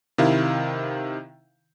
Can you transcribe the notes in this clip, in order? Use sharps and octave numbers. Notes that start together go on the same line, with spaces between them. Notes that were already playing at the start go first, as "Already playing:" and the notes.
C3 D#3 E4 F5